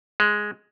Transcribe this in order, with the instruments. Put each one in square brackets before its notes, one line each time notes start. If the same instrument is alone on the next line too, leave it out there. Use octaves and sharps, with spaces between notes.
[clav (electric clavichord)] G#3